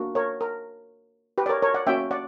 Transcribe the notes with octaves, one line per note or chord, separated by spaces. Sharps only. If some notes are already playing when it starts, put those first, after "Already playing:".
Already playing: A#3 D4 F#4
A#4 C#5
A#4
G4 B4
D5
A#4 C#5
A#4 C#5
D5 F#5
A#3 C#4 F#4 E5 G5
D5 F#5